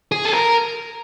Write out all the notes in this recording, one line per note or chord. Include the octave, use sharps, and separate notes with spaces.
G#4
A4
A#4